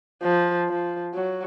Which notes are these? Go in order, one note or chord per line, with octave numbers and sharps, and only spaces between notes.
F3
F3
F#3